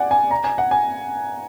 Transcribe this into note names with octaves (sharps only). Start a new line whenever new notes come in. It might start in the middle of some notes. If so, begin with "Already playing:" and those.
Already playing: D5 F#5 G#5
G#5
A#5
G#5
F#5
G#5